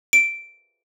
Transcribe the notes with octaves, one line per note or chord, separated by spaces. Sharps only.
D7